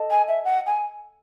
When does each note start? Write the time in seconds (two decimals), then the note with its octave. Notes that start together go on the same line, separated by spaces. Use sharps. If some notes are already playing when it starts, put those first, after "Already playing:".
Already playing: A4 D#5 A5
0.11 G#5
0.28 E5
0.45 F#5
0.67 G#5